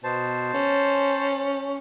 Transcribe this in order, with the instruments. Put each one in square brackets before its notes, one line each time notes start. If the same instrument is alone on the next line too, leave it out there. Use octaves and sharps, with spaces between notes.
[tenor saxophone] B2 [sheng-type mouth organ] C5 A5
[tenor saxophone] C#4